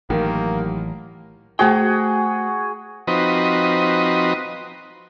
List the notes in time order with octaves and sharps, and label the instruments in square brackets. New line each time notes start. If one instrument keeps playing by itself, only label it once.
[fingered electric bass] A1 [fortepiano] D#3 [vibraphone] F#3 G4 [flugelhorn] A#3
[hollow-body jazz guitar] A3 C5 G5 [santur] F#4 G#4
[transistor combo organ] F3 C4 D#4 F#4 B4 D#5